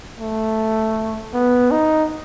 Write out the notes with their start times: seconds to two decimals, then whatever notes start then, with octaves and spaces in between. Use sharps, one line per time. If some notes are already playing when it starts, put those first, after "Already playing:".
0.19 A3
1.34 B3
1.71 D#4